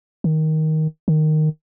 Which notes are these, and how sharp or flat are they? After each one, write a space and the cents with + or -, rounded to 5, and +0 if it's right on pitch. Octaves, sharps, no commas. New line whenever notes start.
D#3 +10
D#3 -10